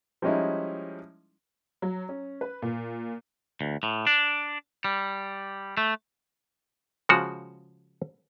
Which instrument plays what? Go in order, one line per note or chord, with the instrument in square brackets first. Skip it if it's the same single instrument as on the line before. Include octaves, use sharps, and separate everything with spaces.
[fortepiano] F3 G3 G#3 C#4 D#4 E4
[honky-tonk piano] F#3
C#4
B4
A#2
[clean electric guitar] D2
A2
D4
G3
A3
[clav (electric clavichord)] C#3 F3 G#3 F#4 C#5